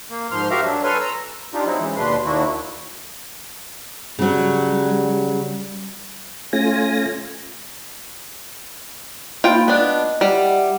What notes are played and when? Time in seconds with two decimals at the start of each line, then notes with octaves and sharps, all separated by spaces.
0.10 A#3
0.31 G#2 F3 C6 F6
0.50 F#4 G4 A#4 E5 F5 A#5
0.64 F#3 D4
0.84 A4 B4 C#5 G#5 C6 F6
1.00 A#5 E6
1.54 D4 D#4 F4 G4
1.66 F#3 C4 D#4 E4
1.80 C#3 E3 G#3
1.96 D#2 B2 D4 B4 C6
2.25 D#2 D#3 A#3 D4 E4 F#4
4.19 C#3 F#3 G3
6.53 A3 C#4 F4 G#5 A#6
9.44 A#3 D#4 F4 G5 B5
9.68 B3 D4 D#5
10.21 G3 E5 F#5